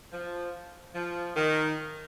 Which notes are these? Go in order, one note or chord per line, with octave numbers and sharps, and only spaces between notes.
F3
F3
D#3